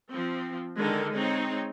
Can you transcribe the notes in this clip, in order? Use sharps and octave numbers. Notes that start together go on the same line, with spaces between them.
F3 C4
D3 D#3 G#3 A4 A#4
G#3 C4 D#4 C#5